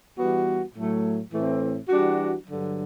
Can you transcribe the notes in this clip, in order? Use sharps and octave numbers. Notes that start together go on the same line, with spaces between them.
E3 G3 B3 F#4
A2 F#3 A3
A2 E3 A3 C4
E3 G3 D4 F#4
G2 D3 F#3